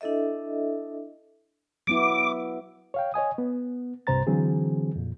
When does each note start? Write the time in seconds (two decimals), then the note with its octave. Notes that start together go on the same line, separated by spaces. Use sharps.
0.01 D4 E4 A4 D#5 E5
1.87 F#3 B3 E4 D6
2.94 C#5 F5 G5
3.14 C#5 D#5 G#5 D#6
3.38 B3
4.07 C2 G2 C3 C5 A#5 A6
4.27 D3 E3 F#3 C4 G#4
4.96 F2 A#2